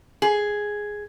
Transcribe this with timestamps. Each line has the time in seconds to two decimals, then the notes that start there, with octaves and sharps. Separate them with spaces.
0.22 G#4